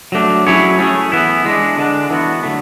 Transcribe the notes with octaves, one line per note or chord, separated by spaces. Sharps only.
F#3 A3 D4
F#3 C#4 E4 G#4 C#5
A3 C#4 G#4
E3 B3 E4
E3 G#3 B3 D4
D3 G#3 D4
E3 B3 F#4
D3 F#3 A3